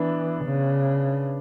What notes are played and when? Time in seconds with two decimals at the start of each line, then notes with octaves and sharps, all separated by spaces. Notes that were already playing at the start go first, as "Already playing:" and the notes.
Already playing: E3 B3 D4
0.45 C#3